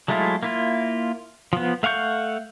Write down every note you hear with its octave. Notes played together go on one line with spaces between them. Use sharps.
F#3 G#3 A3 E4 F4
A#3 E4 F4
F3 B3
A3 F5 F#5 C#6 G6